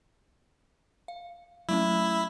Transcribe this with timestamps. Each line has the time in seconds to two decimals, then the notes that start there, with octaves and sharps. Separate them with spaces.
1.08 F5
1.69 F#3 A3 C#4 E4